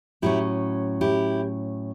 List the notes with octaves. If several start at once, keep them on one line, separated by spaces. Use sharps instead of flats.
A2 F#3 C#4 E4 G4
E4 G4